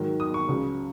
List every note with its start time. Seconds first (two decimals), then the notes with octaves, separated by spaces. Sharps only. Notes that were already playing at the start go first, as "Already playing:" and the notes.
Already playing: G#2 D#3 F#3
0.20 D#6
0.34 C#6
0.48 C#2 C#3 F#3